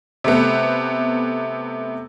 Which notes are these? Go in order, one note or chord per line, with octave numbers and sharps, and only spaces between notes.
C3 A3 B3